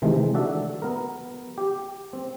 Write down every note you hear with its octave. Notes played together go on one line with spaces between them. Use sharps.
C3 D#3 E3 G#3 A3
D4 F#4 A4 E5
B3 A#4
G4
C4